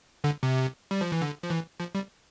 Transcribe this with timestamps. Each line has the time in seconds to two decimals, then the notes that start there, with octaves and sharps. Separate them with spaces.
0.24 D3
0.43 C3
0.91 G3
1.01 F3
1.12 E3
1.22 D3
1.43 F3
1.50 E3
1.80 F3
1.95 G3